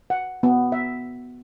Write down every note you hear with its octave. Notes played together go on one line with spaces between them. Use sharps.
F#5
B3
E5